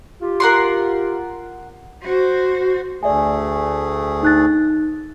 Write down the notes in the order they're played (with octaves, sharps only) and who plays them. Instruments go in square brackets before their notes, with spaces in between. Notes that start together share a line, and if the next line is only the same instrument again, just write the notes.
[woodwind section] F4 G4
[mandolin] A#4 F#5 C6
[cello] F#4 C5
[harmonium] D2 A3 G#4 [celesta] D5 E5 G#5
[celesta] D#4 F#6 A6